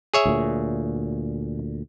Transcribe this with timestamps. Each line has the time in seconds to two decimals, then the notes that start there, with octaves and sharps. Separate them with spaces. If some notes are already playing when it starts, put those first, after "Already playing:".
0.14 G#4 C#5 E5
0.25 D2 A#2